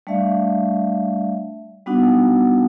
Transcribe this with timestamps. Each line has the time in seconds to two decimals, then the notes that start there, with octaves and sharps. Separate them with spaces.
0.07 G3 A3 D4 D5 E5 F5
1.86 G3 B3 D4 D#4 F#4 F#5